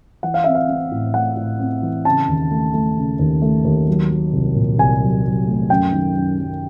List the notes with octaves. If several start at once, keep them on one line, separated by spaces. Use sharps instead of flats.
E3 F#5
F5
C4 E5
F5
C4
A2
A3 F#5
A2
C4
E3
C#3 A5
D#2
A3
A3
C#3
D#2
A3
D#2
F#3
F#3
C2
A#2
C2 G#5
F#3
F#3
A3
F#2 G5
D#3
F#2
F#2